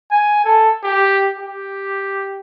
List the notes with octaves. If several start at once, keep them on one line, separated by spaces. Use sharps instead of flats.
G#5
A4
G4
G4